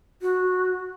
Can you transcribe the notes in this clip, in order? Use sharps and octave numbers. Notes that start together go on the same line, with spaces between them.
F#4